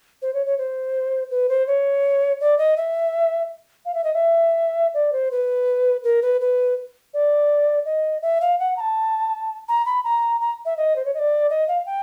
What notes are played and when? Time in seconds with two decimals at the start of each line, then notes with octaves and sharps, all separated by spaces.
0.22 C5
0.34 C#5
0.46 C#5
0.58 C5
1.31 B4
1.49 C5
1.67 C#5
2.41 D5
2.58 D#5
2.77 E5
3.85 F5
3.94 E5
4.04 D#5
4.14 E5
4.94 D5
5.12 C5
5.31 B4
6.04 A#4
6.22 B4
6.41 B4
7.14 D5
7.85 D#5
8.22 E5
8.41 F5
8.59 F#5
8.77 A#5
8.80 A5
9.68 A#5
9.86 B5
10.04 A#5
10.41 A#5
10.65 E5
10.77 D#5
10.96 C5
11.05 C#5
11.14 D#5
11.19 D5
11.50 D#5
11.68 F5
11.86 G5